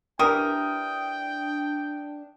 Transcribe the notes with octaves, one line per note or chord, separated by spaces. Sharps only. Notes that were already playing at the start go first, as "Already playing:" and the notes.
E3 D4 G4 A#4 G5 D#6